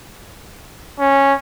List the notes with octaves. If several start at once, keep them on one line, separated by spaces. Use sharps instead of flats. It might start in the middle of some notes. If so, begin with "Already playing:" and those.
C#4